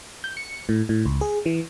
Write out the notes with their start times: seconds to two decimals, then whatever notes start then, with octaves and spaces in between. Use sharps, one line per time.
0.24 G6
0.37 C#7
0.69 A2
0.89 A2
1.05 C#2
1.21 G#4
1.46 E3